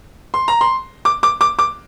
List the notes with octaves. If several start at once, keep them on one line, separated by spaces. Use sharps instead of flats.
C6
A#5
C6
D6
D6
D6
D6